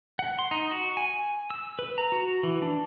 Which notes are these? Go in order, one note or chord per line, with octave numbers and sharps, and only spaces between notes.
F#5
C6
D#4
F#4
G#5
E6
B4
A#5
F#4
E3
D4